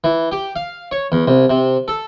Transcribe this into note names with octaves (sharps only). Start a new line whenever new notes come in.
E3
G4
F5
C#5
E2
C2
C3
A4